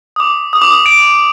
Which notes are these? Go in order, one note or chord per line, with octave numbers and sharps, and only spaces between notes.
D#6
D6
D#6
D6
D#6
D7